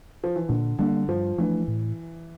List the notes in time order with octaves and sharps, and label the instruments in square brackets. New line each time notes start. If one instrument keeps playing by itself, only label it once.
[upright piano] F3
E3
[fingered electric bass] A#2 [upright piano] D3
[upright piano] D3 [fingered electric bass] G3 A#3
[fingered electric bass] G2 [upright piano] F3
[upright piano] E3 [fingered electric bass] F3 A3 D4
[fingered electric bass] A2